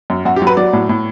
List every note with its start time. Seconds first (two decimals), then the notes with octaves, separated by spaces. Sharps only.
0.10 F#2
0.25 F#2 F#4
0.36 G4
0.42 F#3
0.47 B4
0.57 F#3 D5
0.73 A2
0.89 A2